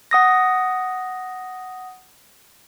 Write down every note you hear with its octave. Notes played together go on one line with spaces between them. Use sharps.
F#5 D#6 A#6